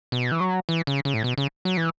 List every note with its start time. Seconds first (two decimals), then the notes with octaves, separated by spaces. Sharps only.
0.12 B2
0.32 E3
0.40 F#3
0.69 E3
0.87 C#3
1.05 C#3
1.14 A2
1.24 B2
1.38 C#3
1.65 F#3
1.77 E3